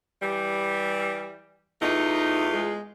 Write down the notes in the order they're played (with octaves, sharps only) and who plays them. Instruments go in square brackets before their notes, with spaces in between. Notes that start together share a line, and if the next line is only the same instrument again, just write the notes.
[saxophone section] E3 G3
[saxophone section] E2 A3 F4 [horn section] D#4
[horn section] G#3